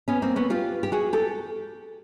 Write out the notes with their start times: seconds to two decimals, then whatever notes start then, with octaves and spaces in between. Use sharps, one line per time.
0.08 B3 C#4
0.22 A#3 C4
0.36 B3 C#4
0.50 F4 G4
0.83 G4
0.92 F#4 G#4
1.13 G4 A4